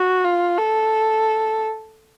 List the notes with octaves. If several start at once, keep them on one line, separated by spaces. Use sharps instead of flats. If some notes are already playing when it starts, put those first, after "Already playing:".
Already playing: F#4
F4
A4